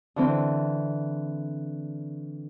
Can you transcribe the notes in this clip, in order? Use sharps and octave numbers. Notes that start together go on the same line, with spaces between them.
D3 E3 C4